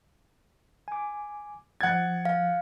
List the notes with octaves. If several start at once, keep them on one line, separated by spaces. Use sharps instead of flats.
G#5 D6
F3 F#5 G#6 A6
F5